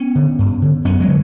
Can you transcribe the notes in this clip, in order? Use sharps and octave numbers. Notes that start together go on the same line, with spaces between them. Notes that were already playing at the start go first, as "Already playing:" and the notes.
Already playing: B3 C#4
D3
G2
D3
F#2 B3 C#4
F#3 G#3
D3